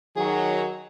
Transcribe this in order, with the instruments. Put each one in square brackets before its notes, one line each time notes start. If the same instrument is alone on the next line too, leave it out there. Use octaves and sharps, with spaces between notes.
[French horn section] D#3 F#3 [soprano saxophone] G#4